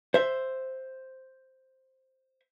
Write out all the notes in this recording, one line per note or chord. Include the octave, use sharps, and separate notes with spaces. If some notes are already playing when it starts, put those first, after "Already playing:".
C5 E5